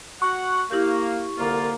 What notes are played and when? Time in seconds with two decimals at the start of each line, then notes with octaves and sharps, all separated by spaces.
0.22 F#4 F#5 C#6
0.71 A#3 E4 G4 G6
1.39 C2 D3 A#3 F4